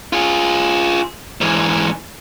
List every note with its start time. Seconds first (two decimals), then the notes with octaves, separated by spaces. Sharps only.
0.13 F4 G#4
1.41 G#2 E3